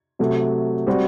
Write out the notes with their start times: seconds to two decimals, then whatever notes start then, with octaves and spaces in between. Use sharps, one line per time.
0.19 C3 F#3 A3
0.87 G3 C4 F#4